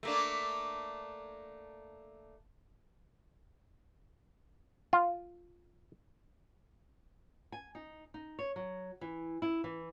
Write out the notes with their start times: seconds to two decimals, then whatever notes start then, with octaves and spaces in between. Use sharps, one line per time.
0.03 A3 A#3 D4
4.93 F4
7.52 G#5
7.75 D#4
8.14 D#4
8.39 C#5
8.56 F#3
9.01 E3
9.42 E4
9.64 E3